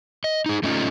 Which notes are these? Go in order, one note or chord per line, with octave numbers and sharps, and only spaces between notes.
D#5
D#4 G#4
A3 C#4 D#4 F4